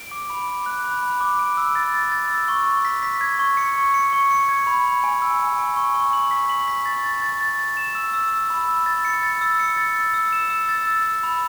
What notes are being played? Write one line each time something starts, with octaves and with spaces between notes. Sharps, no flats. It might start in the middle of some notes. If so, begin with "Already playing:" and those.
Already playing: D7
D6
B5
D6
F#6
B5
B5
D6
D7
E6
A6
A6
A6
E6
C#6
C#6
B6
B6
G#6
C#6
C#7
C#6
C#7
C#6
C#7
G#6
B5
B5
G#5
E6
G#5
G#5
C#6
C#6
F#7
B6
F#7
B6
A6
A6
A6
A6
A6
E7
E6
E6
E6
B5
E6
A6
C#7
A6
E6
C#7
A6
E6
E6
E7
E6
A6
E6
A6
B5